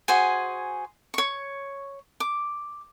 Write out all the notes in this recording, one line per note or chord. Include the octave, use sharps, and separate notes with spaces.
F#4 G#4 C5 G#5
C#5 C#6
D6